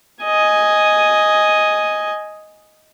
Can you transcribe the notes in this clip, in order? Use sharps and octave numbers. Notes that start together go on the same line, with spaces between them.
D#5 G#5